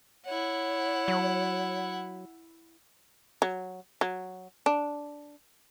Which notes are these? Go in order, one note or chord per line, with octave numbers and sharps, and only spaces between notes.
E4 C#5 F#5
F#3
F#3
F#3
D4